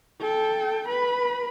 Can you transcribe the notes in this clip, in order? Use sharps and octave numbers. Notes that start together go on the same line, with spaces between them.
A4 G5
B4 B5